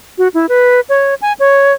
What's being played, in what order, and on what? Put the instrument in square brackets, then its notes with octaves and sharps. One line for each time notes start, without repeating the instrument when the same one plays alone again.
[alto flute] F#4
E4
B4
C#5
G#5
C#5